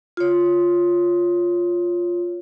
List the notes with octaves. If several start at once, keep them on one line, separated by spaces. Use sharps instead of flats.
F4 C#5